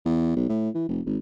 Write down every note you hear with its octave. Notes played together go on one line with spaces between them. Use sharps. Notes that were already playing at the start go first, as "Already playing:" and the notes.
E2
B1
A2
E3
F1
G#1